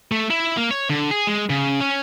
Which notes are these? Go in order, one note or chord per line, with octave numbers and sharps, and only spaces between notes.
A3
E4
A#3
C#5
D3
G#4
G#3
C#3
C#4